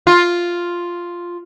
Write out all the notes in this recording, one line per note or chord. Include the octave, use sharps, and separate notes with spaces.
F4